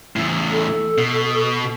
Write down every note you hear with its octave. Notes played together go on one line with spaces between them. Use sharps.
E2 A2
A4
B2